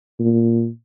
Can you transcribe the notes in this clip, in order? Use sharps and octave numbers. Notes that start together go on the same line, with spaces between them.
A#2